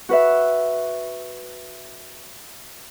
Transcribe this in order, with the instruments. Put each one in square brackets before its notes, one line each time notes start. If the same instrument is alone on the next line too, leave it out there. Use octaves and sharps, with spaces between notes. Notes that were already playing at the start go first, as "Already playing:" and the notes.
[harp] F#4 B4 E5